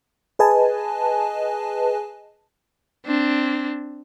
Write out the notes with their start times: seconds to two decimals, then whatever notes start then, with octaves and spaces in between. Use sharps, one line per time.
0.39 G#4 B4 D#5 G#5 A5
3.06 C4 D4